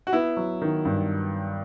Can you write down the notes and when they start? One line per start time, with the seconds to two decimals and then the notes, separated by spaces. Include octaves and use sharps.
0.07 F#4
0.13 B3 E4
0.37 F#3
0.62 D#3
0.85 G2